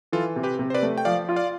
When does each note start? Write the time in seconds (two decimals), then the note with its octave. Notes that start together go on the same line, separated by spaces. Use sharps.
0.12 E3 F4 A4
0.36 C3
0.43 G4 B4
0.59 C3
0.70 C5
0.74 B4 D5
0.82 A3
0.98 G5
1.05 F3 D5 F5
1.29 F4
1.36 D5 F5